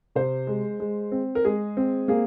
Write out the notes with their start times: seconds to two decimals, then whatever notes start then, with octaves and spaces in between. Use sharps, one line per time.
0.15 C3 C5
0.47 G#3
0.80 G#3
1.12 C4
1.35 A#4
1.44 G#3 G#4
1.77 C4
2.08 A#3 G#4